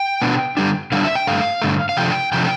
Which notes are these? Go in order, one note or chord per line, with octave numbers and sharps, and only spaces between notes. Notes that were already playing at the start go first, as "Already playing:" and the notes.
Already playing: G5
B2 B3 D4
D3 G3 D4
D3 G3 D4 F5
E5
G5
G2 D3 A3 F5
G2 D3 A3
F5
C3 F3 A3 D4 G5
C3 F3 A3 D4 G5